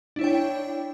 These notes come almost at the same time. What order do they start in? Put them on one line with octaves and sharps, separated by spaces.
D4 E4 C#5 G5